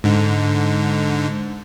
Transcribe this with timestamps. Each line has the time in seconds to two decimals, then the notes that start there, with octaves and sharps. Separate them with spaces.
0.04 G#2 D3